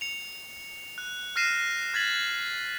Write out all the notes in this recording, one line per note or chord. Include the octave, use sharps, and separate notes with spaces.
C#7 F7
F#6
F6 F#6 A#6 C7 D#7 E7
F#6 G#6 A6 B6 F#7